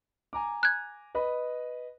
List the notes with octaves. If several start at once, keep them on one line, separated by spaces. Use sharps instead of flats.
G#5 A#5 D6
F#6 G#6
B4 D#5 B5